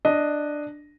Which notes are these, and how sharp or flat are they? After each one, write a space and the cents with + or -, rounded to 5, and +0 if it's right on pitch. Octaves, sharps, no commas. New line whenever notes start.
D4 +10 D#5 +0